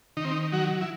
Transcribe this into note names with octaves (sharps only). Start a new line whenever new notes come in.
D#3 D#4
C4
D#4
F#3 F#4
E4